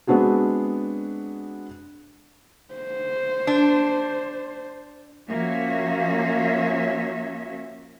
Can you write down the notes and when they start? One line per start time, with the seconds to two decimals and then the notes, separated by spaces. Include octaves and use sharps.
0.07 G#3 B3 C4 D4 F#4 G#4
2.74 C5
3.47 D4
5.29 F3 A#3 C#4 F#4 C#5 E5